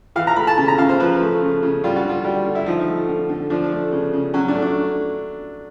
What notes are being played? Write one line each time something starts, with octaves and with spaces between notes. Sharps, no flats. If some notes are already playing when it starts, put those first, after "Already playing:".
E3 F5
A#5
A3 B5
A5
C#3 A5
A#5
C#3 F5
C5
F3 B4
A3
C#3
C#3
G3 F4
F#4
D3 F4
G3
D3
E4
F3 D#4
A3
D3
D3
F3 D4
A3
C#3
C#3
F#3 C#4
D4
A3
D4